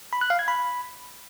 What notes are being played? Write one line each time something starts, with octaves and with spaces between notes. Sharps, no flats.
B5
F#6
F5
G#6
B5